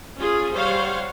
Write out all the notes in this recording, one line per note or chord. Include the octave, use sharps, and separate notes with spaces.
C#4 F4 G#4
G3 C5 C#5 F5 F#5